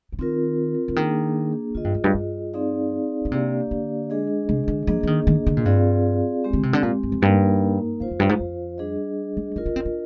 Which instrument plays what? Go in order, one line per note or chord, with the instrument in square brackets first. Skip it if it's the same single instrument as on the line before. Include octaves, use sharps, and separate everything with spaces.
[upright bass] D3
[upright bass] D#3 [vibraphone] C4 F4 A#4
[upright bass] D3
[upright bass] D#3 [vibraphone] A#3 D4 G#4
[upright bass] D3 [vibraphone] F4 G#4 D#5
[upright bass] G2
F2
G2
G2
[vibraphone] C4 D#4 G#4 D5 F5
[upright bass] D3
[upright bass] C3 [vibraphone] A#3 D4 G4 D5 F5
[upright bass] D3
[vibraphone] G#3 D4 G#4 D#5
[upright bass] C3
D3
[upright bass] F3 [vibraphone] A#3 D4 G#4 D#5
[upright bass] F3
D#3
D#3
D3
A#2
[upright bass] G2 [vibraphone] C4 F4 G#4 D5 F5
[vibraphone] G#3 C4 G4
[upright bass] D3
C3
D3
A#2
G2
F2
[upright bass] G2 [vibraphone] A#3 D#4 A#4
[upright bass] F2 [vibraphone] F4 C5 F5
[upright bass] F2
G2
G#2
F2
[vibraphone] G3 D4 G#4 D#5
[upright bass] G#3
[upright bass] D#4 [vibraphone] F4 A#4 D#5
[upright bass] D4
C4
D4